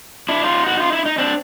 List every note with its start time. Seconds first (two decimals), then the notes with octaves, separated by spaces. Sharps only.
0.29 D4 E4
0.43 D#4 F4
0.67 F#4
0.80 F4
0.92 E4
1.06 D#4
1.18 C4 D4